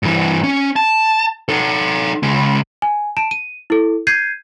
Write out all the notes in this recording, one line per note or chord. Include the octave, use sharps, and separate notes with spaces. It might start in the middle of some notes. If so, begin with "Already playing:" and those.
G2 E3
C#4
A5
D#4 A4
C#3 G#3
G#5
A5 D7 E7
D#7
E4 A4
G6 G#6 C7 D#7